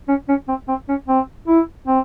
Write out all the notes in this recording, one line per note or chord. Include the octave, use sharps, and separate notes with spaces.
C#4
C#4
C4
C4
C#4
C4
E4
C4